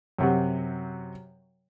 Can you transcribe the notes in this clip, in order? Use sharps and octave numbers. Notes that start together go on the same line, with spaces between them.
F#2 C3 F#3